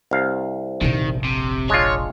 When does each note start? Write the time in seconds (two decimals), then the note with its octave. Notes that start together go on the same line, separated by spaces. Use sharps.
0.11 C2 F5
0.81 F1 A#1 D#3
1.24 C3
1.70 G#3 D4 F4 C#5